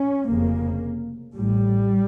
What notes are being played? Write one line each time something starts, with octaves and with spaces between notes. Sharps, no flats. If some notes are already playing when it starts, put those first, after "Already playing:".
Already playing: C#4
F1 F2 C#3 A#3
A1 A2 G3